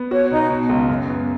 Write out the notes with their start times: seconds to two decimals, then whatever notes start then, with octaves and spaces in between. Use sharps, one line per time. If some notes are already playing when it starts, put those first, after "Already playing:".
Already playing: B3
0.11 F#4 C#5
0.31 B2 D#4
0.50 B2
0.69 C#2
0.89 F#2
1.09 B3